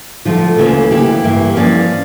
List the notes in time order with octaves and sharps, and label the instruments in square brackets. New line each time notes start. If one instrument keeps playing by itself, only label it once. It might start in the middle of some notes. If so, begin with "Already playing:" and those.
[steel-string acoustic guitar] D3 F3 A3 F4
D2 C#3 E3 A#3 C#4
D2 C#3 E3 E4 G4
G2 E3 A#3 E4
G2 F3 C#4 D5 F5